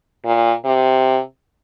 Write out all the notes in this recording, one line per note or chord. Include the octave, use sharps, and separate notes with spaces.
A#2
C3